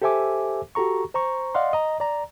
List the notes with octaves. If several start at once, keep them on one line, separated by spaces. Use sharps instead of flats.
G4 A4 C5 E5 G#5 D6
F#4 G4 A4 A#5 C#6
C5 A#5 C#6
D5 D#5 F5 F#5 C6
D#5 A#5
D5 A#5